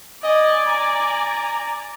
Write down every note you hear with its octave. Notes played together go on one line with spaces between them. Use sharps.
D5 D#5 G#5
A#5